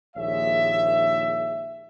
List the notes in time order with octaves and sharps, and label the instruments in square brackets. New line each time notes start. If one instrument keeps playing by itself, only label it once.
[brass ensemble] A#1 D#2 G#3 G#4 C#5 E5